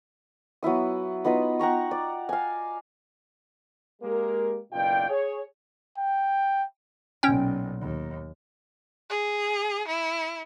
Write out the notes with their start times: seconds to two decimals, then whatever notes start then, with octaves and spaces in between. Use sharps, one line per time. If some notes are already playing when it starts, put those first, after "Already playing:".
0.63 F#3 B3 E4 D#6
1.25 B3 D#4 F4 B4
1.59 F#5 G5 A#5 C#6
1.91 D5
2.29 F5 G#5
4.02 G#3 A#3 G4 A#4
4.73 F#1 B1 B2 F4 D5 G5
5.09 G#4 C#5
5.98 G5
7.23 B1 A#2 C#4 G5
7.80 D#2
9.10 G#4
9.87 E4